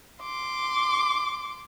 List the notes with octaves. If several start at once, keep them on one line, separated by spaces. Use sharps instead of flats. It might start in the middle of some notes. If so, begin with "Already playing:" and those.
C6 D6